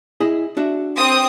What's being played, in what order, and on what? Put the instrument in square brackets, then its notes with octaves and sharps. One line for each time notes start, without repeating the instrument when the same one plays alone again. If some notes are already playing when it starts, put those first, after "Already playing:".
[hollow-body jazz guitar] E4 G#4 D#5
D4 F#4 E5
[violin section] C4 D#6